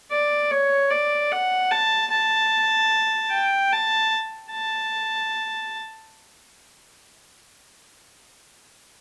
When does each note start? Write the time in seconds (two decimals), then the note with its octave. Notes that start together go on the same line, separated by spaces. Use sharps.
0.11 D5
0.51 C#5
0.90 D5
1.31 F#5
1.71 A5
2.10 A5
3.31 G5
3.72 A5
4.51 A5